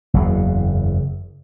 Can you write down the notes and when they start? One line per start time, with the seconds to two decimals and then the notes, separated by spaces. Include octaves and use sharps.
0.14 F#1 E2